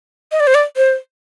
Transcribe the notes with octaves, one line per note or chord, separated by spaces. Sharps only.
D#5
D5
C5
D5
C5